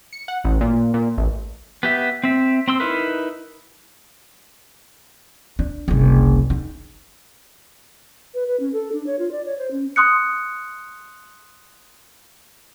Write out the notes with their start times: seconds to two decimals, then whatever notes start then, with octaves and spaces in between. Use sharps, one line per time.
0.13 C#7
0.28 F#5
0.44 A1
0.61 A#2
0.94 A#2
1.17 A1
1.83 B3 G4 E5
2.23 C4 E5
2.68 C4 C6 E6
2.80 D#4 E4 A#4 B4
5.59 D4
5.88 F#1 C2
6.50 D#4
8.34 B4
8.47 B4
8.60 C#4
8.73 A4
8.93 D4
9.06 C#5
9.19 F4
9.32 D5
9.46 C#5
9.59 C5
9.71 C#4
9.96 C6 D#6 F#6 C#7